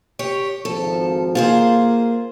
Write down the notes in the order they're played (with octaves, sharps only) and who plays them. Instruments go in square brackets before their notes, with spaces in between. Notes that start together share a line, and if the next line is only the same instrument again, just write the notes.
[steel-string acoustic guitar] G4 C#5
[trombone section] G#1 F3 [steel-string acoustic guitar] A4
[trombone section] A#3 [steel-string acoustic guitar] F4 G#4 C5